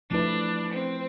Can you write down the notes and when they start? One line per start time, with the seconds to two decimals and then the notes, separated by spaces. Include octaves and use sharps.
0.10 F3 A3 D4 E4 B4
0.72 C4